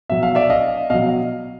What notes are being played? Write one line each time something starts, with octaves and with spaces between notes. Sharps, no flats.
B2 F#3 E5
F5
D5 E5
D#5 F5
B2 F#3 D#5 F5